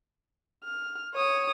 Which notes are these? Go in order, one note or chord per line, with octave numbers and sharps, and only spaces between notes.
F6
C#5 D#6